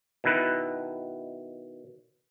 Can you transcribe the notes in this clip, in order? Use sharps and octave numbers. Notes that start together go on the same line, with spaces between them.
B2 D#3 E4 B4